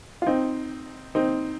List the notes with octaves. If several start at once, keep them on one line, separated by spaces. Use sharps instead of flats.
F4
C4 D#4
C4 D#4